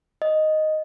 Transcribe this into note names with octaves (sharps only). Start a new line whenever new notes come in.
D#5